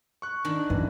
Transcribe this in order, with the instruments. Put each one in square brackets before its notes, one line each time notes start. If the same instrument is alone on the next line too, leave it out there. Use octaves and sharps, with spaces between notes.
[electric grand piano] C#6 F#6
[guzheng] D#3 D4
[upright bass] F#2 [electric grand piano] E3